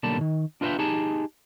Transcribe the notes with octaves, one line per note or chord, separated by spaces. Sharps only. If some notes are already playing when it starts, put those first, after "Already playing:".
B1 D3 G3 A#3 A5
B2 D#3
D4 F4 B4 D#5 E5 G5
D#4 G4 G#4 A5